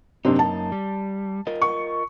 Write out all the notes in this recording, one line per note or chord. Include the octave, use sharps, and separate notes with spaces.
F#2 C3 A#3 C4 D4 D#4
A5
G3
F4 A#4 D#5
C#6